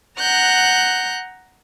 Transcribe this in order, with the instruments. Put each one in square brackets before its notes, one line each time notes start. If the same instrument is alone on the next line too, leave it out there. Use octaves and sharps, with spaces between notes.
[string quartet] F#5 A#5 F#6 G6